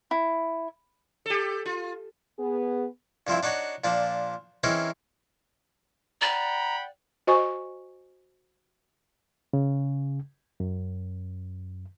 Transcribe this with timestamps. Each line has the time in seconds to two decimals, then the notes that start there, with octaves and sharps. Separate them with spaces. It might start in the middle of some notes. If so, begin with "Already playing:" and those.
0.11 E4
1.26 G4 A4
1.66 F4
2.39 B3 G#4
3.27 G2 F3 C4 E4
3.43 D4 D#4 F#4 C#5
3.84 A#2 F3 D4
4.63 E3 C4 C#4 D#4 G#4 A#4
6.21 D5 F#5 G5 A#5 B5
7.27 F#4 C5 D#5 G#5 C#6
9.53 C#3
10.60 F#2